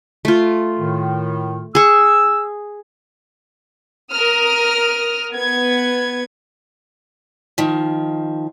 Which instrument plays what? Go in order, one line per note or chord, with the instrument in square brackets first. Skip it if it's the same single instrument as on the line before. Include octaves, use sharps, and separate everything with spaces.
[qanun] A3 F4
[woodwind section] A2 D#3
[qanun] G#4 C#6 [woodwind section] E6
[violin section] A#4 D#6 F6
B3 G#6
[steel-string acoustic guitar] D#3 F3